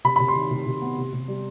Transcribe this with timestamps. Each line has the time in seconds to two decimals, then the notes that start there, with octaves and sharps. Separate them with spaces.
0.04 C3 B5
0.16 C3 B5
0.28 C6
0.35 D#3
0.51 C3
0.66 C3
0.82 B3
0.98 C3
1.13 C3
1.28 G3